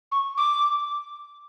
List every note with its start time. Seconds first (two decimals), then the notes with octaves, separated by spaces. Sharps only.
0.12 C#6
0.38 D6